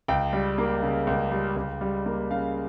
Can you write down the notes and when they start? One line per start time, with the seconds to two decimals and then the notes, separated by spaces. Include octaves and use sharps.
0.08 C#2 G5
0.33 G3
0.58 A#3
0.83 C#3
1.07 C#2
1.32 G3
1.56 C#2
1.81 G3
2.06 A#3
2.31 C#3 F5